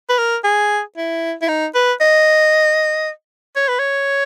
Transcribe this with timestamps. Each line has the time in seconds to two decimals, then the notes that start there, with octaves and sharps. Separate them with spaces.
0.09 B4
0.18 A#4
0.44 G#4
0.97 E4
1.42 E4
1.48 D#4
1.74 B4
2.01 D#5
3.56 C#5
3.68 B4
3.79 C#5